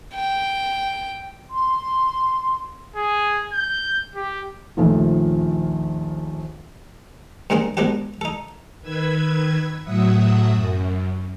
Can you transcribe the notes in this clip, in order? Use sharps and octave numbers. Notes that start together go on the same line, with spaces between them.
G5
C6
G#4
G6
G4
A#1 D#2 D#3 F3 A3
G2 D#3 G#3 A#3 C4
G#2 B2 D#3 D4 G4
D#4 A4
D#3 B4 E6 G#6
A2 F#3 E5 F#5 D#6
F#2